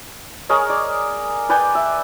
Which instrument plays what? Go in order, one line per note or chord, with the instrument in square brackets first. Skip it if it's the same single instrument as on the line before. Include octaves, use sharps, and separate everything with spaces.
[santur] G#4 A#4 C#5 D#5
D5
B4 D5 G5 G#5
E5